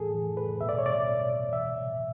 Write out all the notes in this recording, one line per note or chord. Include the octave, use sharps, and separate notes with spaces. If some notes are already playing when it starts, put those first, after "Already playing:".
Already playing: A2 E3 G#4 A4
E3
A2 B4
B2 E5
D5
C#5
B2 D5
B2
B2
E3 E5
A2